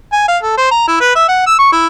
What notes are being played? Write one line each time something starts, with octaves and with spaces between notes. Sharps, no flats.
G#5
F5
A4
C5
A#5
E4
B4
E5
F#5
E6
C#6
E4